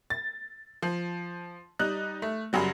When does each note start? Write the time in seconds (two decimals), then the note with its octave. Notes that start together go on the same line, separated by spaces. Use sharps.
0.10 A6
0.82 F3
1.79 G3 D#4 F#6
2.22 A3
2.53 F#2 C#3 F#3 G3